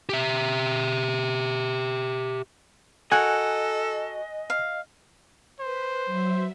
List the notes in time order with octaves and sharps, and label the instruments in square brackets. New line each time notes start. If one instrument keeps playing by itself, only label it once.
[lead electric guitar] G4 E5
[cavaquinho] F#4 A#4 [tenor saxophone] A4 [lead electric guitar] D#5 [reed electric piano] G#5 F#6
[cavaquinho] F5
[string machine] B4 [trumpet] C5
[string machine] F#3 E5